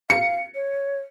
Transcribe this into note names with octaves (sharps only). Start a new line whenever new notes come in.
F5 C#7
C#5